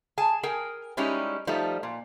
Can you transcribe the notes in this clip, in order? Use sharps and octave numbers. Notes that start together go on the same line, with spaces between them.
G#4 G#5 A5
G#4 A#4 G5 G#5
G3 G#3 C#4 D#4 E4 G4
F3 G3 A3 D#4
A#2